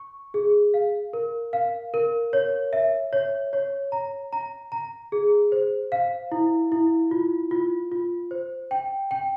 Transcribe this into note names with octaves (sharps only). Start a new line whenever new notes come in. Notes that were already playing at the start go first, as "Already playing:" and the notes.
Already playing: C#6
G#4
F5
A#4
F5
A#4
C#5
E5
C#5
C#5
A#5
A#5
A#5
G#4
C5
F5
E4
E4
F4
F4
F4
C5
G5
G5